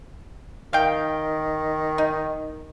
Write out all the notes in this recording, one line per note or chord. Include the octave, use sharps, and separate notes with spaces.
D#3 F5 G5
D#4